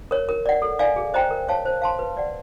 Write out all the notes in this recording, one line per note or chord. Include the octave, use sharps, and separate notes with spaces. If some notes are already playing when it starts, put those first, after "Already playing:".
A#4 C#5
A#4
D5 F#5
A4
D5 F5 G#5
G#4
C5 D#5 G5 A#5
A#4
C#5 F5 A5
C5
F5 A5 C6
B4
D5 F#5